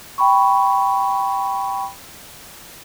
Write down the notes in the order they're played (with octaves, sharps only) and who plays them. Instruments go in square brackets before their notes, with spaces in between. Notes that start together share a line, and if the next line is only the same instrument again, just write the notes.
[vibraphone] G5 B5 C#6